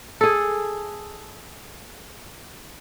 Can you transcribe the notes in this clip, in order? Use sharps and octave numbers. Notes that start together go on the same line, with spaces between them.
G#4 A4